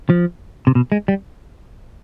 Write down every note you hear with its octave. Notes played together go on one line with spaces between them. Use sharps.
F3
C3
B2
G#3
G3